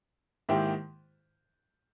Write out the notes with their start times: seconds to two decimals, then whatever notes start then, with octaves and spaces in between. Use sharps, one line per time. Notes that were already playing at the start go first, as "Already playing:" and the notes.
0.49 G#2 D#3 A#3 E4 G4